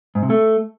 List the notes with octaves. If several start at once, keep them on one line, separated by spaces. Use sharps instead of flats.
G#2
C3
A3